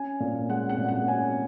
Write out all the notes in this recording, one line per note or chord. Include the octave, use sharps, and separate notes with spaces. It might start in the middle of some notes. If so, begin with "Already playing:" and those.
Already playing: C#4 G#5
A#2
G#3 F#5
F#5
A#2
F#5
C#4 G#5